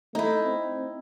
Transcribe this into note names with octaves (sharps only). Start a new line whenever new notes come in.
A3 D#4 E4
C4